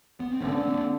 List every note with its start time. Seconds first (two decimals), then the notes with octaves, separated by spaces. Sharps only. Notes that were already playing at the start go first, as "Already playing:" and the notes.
0.20 B3
0.31 C4
0.41 D3 B3 C#4
0.56 C#4
0.65 A#3 C4